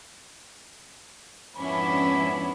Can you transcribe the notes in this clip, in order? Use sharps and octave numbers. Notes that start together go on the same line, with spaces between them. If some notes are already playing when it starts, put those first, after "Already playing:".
F2 G#2 B3 C#4 D4 E4 B5